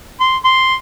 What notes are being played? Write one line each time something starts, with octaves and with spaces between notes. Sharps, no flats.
C6
C6